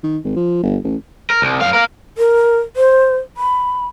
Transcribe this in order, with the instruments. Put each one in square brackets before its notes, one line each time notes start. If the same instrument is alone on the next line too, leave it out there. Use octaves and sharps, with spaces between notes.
[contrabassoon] D#3
G#1
F3
G1
A1
[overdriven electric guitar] A#4
C2
F#2 F5
A#4 F5
[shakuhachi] A#4
C5
B5